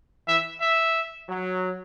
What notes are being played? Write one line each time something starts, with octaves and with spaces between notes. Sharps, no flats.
E3 E5
E5
F#3